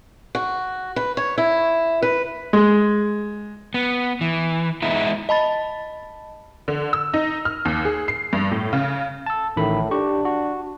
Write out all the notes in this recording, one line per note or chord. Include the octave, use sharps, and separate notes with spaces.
F#4
B4
C#5
E4
B4
G#3
B3
E3
G#3 B3 D#4 E4
D#5 A5 B5 A6
D3
E6
D#4
F6
D#2
G#4
C7
G2
A2
C#3
A5 E6
A1 A2 D#3 B5
D4 G4 C#6
F#4